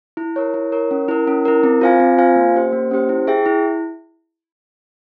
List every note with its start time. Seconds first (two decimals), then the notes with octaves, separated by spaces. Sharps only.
0.17 E4
0.36 A#4 C#5
0.54 E4
0.72 A#4 C#5
0.91 C#4
1.08 E4 A#4
1.27 C#4
1.45 E4 A#4
1.63 C4
1.81 F4 C5 F5 G#5
2.00 C4
2.18 F4 C5 F5 G#5
2.36 A#3
2.54 C#4 G4 C5
2.72 A#3
2.91 C#4 G4 C5
3.09 E4
3.27 G#4 E5 G5
3.46 E4